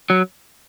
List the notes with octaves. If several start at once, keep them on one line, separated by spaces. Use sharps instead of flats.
F#3